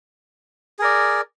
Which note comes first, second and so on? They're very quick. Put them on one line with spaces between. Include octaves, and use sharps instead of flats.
G#4 A#4 D5